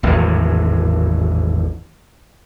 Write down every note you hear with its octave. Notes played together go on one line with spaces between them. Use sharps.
G#1 E2 A2 F#3